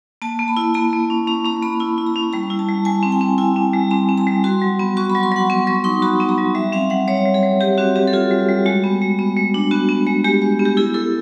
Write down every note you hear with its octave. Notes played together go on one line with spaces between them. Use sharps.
A#3 A5
A#3
B5
E4
A#3 A#5
A#3
C#4
C#4 A#5
C#4 A#5
A#3 B5
E4 B5
E4
A#5
C#4
G3 A#5
E4
A5
G3
G3 G#5
C4
G5
C4
E4 G#5
C4
G3
C4 A#5
C4
A#5
G3
F#4 C6
F#3
B3
F#4 C#6
B5
F#3
C6
F#3 F#5
B3 C6
F#3 C#6
D#4 C6
F#4 B5
B3
A#5
F#3
G3 E5
C4 F5
G3 F#5
G3 C#5
G3
G#4
G3
G3 G4
C4 F#4
C4 G4
A4
F4 G#4
G3
G3
G#3 F#4
B3
G#3
B3
G#3
D4
B3 F#4
B3
G#3
G#3 G4
G#3
B3
G4
E4 G#4
E4 A4